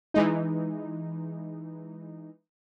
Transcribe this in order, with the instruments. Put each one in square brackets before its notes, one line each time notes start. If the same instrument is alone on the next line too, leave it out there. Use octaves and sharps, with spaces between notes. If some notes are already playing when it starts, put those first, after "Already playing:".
[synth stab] E3 G#3 D#4